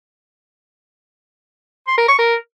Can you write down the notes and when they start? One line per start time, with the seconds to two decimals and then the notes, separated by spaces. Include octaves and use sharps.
1.87 C6
1.98 A#4
2.08 C#6
2.19 A#4